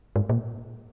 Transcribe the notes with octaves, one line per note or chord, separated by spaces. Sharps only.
G#2
A#2